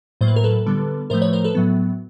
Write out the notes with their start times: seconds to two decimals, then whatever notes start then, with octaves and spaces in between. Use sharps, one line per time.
0.21 A2 F#3 A#3 C5
0.28 B4
0.36 A#4
0.44 A4 B4
0.66 D3 G3 B3
1.10 A2 F3 A3 A#4 C5
1.22 B4 C#5
1.33 A#4 C5
1.44 A4 B4
1.55 A2 F#3 B3